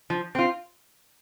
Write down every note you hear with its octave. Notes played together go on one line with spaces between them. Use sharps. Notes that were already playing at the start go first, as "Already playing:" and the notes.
F3
C4 F4